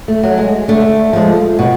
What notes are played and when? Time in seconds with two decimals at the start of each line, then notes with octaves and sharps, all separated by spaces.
0.08 A3
0.23 F#3
0.38 G#3
0.68 D3 A3
1.13 F3 G#3
1.59 B2